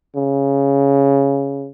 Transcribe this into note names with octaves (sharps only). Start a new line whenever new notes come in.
C#3